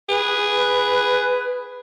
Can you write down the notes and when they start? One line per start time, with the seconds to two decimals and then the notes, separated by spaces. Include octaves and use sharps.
0.09 G#4 B4